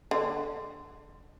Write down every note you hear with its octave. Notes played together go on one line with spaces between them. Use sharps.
D3